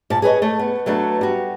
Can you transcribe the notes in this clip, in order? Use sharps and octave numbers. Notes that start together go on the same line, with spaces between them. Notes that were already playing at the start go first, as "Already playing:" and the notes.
A#2 A5
G#4 B4 C#5 D#5
A3
B3
F#3 A3 B3 D4
G3 F#4